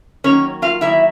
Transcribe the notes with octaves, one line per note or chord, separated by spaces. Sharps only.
D#3 F#3 A#3 C#4 C#5
F4 F5
D#3 F#3 A#3 E4 E5